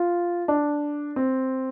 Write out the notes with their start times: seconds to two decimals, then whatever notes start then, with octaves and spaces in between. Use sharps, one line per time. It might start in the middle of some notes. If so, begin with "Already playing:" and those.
Already playing: F4
0.48 D4
1.16 C4